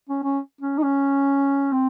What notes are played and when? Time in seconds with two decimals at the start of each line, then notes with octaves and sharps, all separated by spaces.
0.09 C#4
0.23 C#4
0.61 C#4
0.78 D#4
0.83 C#4
1.72 C4